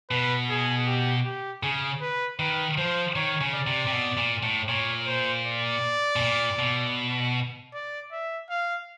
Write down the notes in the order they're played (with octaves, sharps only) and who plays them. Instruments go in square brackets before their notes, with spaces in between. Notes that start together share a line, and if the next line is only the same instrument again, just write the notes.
[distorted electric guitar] B2 [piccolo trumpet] B4
[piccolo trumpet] G#4
G4
G4
[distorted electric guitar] C#3 [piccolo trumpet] G#4
[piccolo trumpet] B4
[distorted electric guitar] D#3 [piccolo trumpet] B4
[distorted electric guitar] F3 [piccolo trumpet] C5
[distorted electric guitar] D#3 [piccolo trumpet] C#5
[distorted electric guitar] C#3
[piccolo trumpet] D5
[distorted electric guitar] C3
C3
B2
A#2
A2
[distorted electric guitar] A#2 [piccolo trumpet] C#5
[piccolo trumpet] C5
D5
[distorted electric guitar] B2
A#2
B2
[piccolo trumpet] D5
E5
F5